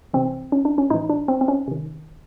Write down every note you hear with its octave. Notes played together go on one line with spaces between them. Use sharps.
C3 E3 C4
C#4
D4
C#4
A2 E3 D#4
D4
C4
C4
C#4
C3 D#3